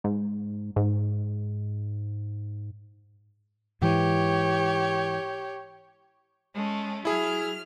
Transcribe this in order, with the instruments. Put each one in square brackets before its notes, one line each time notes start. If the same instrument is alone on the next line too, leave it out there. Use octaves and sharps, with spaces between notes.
[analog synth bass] G#2
G#2
[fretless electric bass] G#2 E3 [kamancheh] G4 C#5
[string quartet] G#3 A3 C#4
[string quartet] F#3 F6 [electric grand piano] E4 G#4